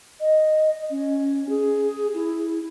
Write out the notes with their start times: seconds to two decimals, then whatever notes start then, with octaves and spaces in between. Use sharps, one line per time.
0.20 D#5
0.90 C#4
1.49 G#4
2.14 E4